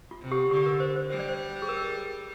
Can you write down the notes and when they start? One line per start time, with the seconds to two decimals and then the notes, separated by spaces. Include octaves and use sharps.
0.11 F4
0.21 C3
0.32 G4
0.50 D3 G4
0.66 A#4
0.80 C5
0.96 C5
1.10 G3 C5
1.19 D5
1.29 C5
1.62 G#4
1.69 A#4